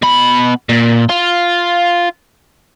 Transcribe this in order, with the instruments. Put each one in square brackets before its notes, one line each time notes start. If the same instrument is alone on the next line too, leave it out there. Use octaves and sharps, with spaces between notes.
[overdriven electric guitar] B2 B5
A#2
F4